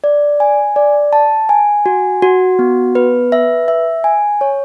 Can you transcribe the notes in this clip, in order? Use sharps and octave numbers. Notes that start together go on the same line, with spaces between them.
D5
G#5
D5
A5
G#5
F#4
F#4
B3
B4
E5
E5
G#5
C#5